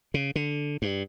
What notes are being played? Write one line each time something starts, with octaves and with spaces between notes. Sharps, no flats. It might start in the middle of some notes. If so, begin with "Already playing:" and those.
C#3
D3
G2